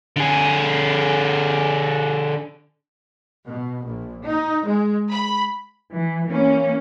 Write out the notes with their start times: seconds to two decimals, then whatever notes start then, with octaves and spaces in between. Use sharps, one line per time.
0.16 D3 G#4
3.47 B2
3.84 A#1
4.24 D#4
4.67 G#3
5.10 B5
5.96 E3
6.27 E3 A#3 C#4